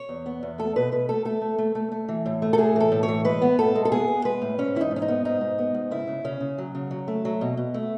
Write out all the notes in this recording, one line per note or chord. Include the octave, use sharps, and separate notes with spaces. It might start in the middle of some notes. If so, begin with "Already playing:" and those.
Already playing: C#5
E2
B3
E2
A3 A4
B2 B4
B2 B4
A3 A4
A3 A4
A3
A3
A3
A3
E3
A2
A3
A4
A2 G#4
E3 A4
A2
C#5
E3
G#3 B4
B3
A2 A4
G#3
A4
B3 G#4
B3
G#3 B4
A2
G#2 C#4
E3 E4
D#4
G#2
C#4
D#4
B3
G#2 D#4
G#2
B3
G#2
C#3 E4
C#3
C#3 C#4
C#3
F#3
C#3
F#3
A3
F#3
B2
B2
A3